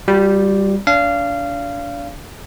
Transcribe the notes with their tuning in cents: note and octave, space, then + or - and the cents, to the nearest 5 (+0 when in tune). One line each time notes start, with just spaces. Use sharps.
G3 +0 F#4 -45
D4 -35 F5 -20